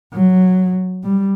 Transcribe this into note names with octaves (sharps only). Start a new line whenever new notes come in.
F#3
G3